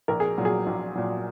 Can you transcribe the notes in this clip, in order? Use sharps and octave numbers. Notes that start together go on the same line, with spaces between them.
A#1 A#4
G#4
A#2 F#3
G#4
A#1
A#2 F#3